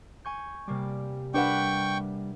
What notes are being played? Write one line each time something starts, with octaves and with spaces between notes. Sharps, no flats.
G#5 C#6 G6
C3 G3 A#3 D6
D4 A#4 B4 E5 F#5 G5 C#6 D6